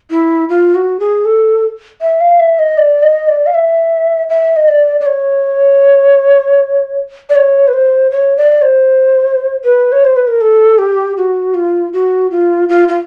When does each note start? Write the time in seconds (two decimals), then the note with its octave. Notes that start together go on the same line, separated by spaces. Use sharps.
0.10 E4
0.49 F4
0.75 F#4
1.00 G#4
1.25 A4
2.02 E5
2.21 F5
2.40 E5
2.59 D#5
2.78 D5
3.03 D#5
3.28 D5
3.46 F5
3.54 E5
4.30 E5
4.56 D#5
4.68 D5
5.01 D5
5.06 C#5
7.30 D5
7.36 C#5
7.68 B4
7.73 C5
8.11 C#5
8.37 D5
8.62 C5
9.64 B4
9.92 C#5
10.04 C5
10.16 B4
10.28 A#4
10.41 A4
10.78 G4
11.17 F#4
11.54 F4
11.93 F#4
12.31 F4
12.69 F4
12.88 F4